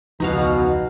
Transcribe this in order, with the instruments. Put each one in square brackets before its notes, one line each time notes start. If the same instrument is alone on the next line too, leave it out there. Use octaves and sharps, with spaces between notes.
[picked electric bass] E1 C#2 F3 [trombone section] B2 [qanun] D#4 F#4 F5